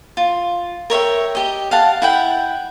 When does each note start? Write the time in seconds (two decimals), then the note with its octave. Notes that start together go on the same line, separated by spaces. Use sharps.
0.17 F4
0.90 A#4 C#5 E5 G5
1.35 G4 D#5
1.71 F5 F#5 A5
2.02 E4 F#5 G5